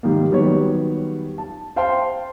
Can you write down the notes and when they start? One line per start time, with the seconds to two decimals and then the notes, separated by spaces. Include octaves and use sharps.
0.03 G#2 C3 D#3 G3 A#3
0.32 D#3 F#3 G3 B3 G4 C#5
1.38 A5
1.76 C5 F5 G5 A5 C6